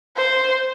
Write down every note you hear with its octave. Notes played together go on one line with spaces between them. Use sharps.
C5